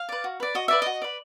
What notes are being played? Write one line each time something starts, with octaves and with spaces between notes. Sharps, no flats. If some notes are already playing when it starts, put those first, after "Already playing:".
Already playing: F5
B4 D5
F#4
B4 D5
F#4 D#5
B4 D5 E5
F#4 D#5
B4 D5